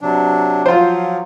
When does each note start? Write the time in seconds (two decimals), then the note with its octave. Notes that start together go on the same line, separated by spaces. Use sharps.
0.01 C3 F#3 D4
0.66 F3 F#3 F4 C5